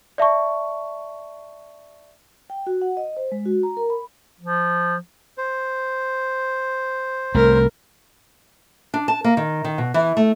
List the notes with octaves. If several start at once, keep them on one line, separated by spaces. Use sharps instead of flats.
D5 E5 A5 C#6
G5
F#4
F#5
D#5
C5
G#3
F#4
A#5
A#4
B5
F3
C5
C2 A3 A#4
D4
A5
A#3
D#3
D#3
B2
E3
A3